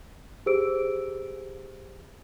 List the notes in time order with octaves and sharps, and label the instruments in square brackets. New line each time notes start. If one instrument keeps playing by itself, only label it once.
[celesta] G4 G#4 C5 E6 D7